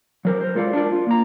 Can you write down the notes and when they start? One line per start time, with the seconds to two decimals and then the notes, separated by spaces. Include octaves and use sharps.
0.25 F#3 A#4 C5
0.41 A#4 C5
0.55 G#3 F4 A4 D5 F5
0.73 D4 F4 A4 A#4 D5
0.92 F4
1.07 A#3 A#5